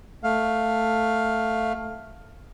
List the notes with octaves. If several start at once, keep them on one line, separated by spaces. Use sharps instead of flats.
A3 F5